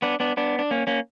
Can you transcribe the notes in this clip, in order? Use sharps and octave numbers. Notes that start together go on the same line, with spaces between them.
B3 D4
B3 D4
B3 D4
D4
A#3 C#4
A#3 C#4